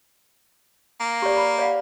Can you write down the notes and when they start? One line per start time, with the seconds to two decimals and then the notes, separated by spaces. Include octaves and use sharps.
1.00 A#3
1.22 G4 D5
1.37 B5
1.59 D5 F5 F#5